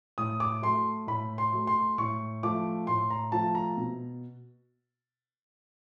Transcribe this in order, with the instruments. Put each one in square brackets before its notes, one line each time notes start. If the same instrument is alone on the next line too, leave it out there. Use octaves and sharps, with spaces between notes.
[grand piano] A2 D#6
D6
F#3 A3 C6
A2 B5
C6
F#3 A3
C6
A2 C#6
F3 A3 D6
A2 C6
A#5
F3 A3 A5
A#5
B2